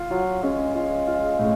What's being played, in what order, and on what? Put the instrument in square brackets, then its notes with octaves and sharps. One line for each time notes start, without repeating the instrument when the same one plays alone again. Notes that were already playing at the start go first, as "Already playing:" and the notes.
Already playing: [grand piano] F4
[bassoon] F#3 [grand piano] F4
[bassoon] G#3 [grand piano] C#4
[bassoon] G#3 [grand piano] F4
[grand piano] F4
A2